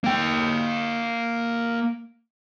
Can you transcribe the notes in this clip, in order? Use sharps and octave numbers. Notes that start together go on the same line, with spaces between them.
A#3 G5